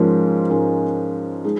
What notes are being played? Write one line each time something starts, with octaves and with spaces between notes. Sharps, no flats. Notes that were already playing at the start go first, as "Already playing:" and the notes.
Already playing: G#2 F3 G#3 C#4 A#4
G#2 G#3 C#4 A#4
G#3 D#4 G#4